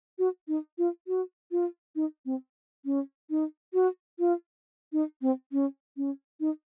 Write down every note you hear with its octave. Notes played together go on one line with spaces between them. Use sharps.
F#4
D#4
F4
F#4
F4
D#4
C4
C#4
D#4
F#4
F4
D#4
C4
C#4
C#4
D#4